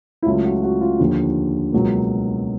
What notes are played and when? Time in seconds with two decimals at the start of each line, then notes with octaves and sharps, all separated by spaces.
0.23 E4
0.26 C#2 C#3 F#3 A3 F4
0.45 F#4
0.64 F#4
0.81 F4
1.00 D#2 D3 F3
1.73 C#2 B2 F#3 A#3